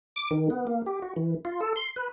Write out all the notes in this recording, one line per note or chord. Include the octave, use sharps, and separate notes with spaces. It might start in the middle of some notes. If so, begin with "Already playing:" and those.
D6
D#3
B3
A#3
G4
F#4
E3
F4
A4
C6
B4